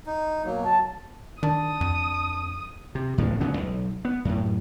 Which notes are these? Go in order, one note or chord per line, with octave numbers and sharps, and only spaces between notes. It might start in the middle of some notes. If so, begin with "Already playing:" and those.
D#4
B2 F#3 A#3
A5
D#3 D4 A5 D#6
F2
C3
E2 A2 D3 F3
E1 D2 C#3 B3
B1
B3
F#2 A2